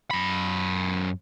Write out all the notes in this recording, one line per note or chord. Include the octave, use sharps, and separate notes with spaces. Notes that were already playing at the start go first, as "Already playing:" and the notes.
F#2 B5